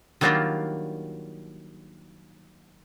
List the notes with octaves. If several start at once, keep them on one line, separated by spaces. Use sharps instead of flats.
D#3 F#3 G3 A#3 D4 F4